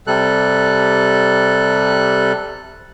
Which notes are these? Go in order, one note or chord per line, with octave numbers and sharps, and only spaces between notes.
C3 G3 A4 F#6